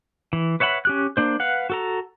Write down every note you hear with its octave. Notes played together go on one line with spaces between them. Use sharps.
E3
B4 C#5 E5 F#5 B5
C#4 G4 F#6
A#3 D4 C5
B4 F5 F#5
F#4 A4 A#5